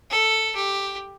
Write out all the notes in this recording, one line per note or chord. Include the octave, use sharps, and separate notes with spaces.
A4
G4